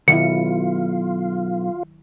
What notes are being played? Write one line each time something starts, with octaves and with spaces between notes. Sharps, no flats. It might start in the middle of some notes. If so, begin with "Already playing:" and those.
B1 D#3 F#3 E4 F4 C#7